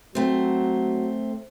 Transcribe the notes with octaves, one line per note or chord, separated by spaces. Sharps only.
F#3 A3 C4